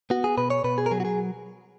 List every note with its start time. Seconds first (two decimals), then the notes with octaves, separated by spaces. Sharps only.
0.10 B3 F#4
0.24 G#4
0.38 B2 B4
0.50 C#5
0.64 B2 B4
0.78 G#4
0.86 A#4
0.91 F#3 G#4
1.00 F#4
1.05 G#4